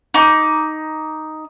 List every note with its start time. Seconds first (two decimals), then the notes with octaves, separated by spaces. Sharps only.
0.14 D#4 D6